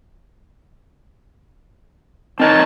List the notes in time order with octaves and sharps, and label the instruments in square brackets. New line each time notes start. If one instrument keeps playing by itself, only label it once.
[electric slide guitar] C4 A#4 C#5 [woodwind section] D#4 A5